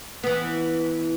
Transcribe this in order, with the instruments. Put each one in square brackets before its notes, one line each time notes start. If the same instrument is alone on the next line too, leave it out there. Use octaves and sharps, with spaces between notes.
[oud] E3 B3